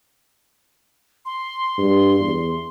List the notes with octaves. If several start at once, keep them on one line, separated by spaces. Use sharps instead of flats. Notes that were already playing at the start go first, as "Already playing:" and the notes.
C6
G2
E2